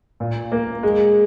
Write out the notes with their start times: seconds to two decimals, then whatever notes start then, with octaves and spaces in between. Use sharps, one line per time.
0.20 A#2
0.52 A#3
0.83 G#3